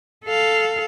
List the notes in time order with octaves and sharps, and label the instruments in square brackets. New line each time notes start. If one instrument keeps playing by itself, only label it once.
[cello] A4 F5